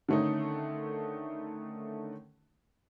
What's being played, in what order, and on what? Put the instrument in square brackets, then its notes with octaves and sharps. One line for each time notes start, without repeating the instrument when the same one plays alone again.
[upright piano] D3 D#3 A3 C#4 D#4